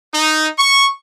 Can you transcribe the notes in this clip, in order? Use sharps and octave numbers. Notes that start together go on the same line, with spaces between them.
D#4
C#6